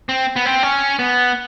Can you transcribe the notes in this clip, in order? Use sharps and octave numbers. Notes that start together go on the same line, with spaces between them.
C4
B3
C4
C#4
B3